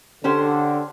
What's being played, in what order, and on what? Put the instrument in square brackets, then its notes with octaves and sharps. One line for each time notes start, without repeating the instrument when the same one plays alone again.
[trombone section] D3 [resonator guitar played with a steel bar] C#4 G4 C5